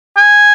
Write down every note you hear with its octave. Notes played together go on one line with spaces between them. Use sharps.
G#5